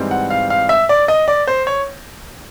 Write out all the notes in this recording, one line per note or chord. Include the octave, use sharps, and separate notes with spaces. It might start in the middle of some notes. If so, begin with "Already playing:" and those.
Already playing: G#2 E3 G3 C4
F#5
F5
F5
E5
D5
D#5
D5
C5
C#5